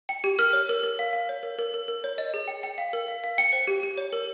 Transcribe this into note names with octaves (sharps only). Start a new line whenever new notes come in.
G5
G4
A#4 F6
C#5
A#4
A#4
F5
F5
C#5
A#4
A#4
A#4
A#4
C#5
D#5
G#4
G5
G5
F5
A#4
F5
F5
G5 C#7
C5
G4
G4
C#5
A#4